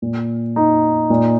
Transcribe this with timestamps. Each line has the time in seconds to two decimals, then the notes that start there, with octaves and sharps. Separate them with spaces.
0.02 A#2
0.56 D#4
1.10 A#2